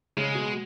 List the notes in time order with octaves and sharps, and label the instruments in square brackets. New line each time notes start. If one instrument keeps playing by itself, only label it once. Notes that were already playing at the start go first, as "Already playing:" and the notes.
[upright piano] C#3 [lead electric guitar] G#3
[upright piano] B2